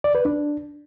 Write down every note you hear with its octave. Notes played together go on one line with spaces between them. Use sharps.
D5
B4
D4